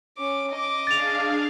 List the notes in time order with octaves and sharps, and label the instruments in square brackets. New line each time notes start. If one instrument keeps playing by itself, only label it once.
[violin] C#4 D6
D#5 D6
[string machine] D4 G#4 F5 [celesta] A6 F7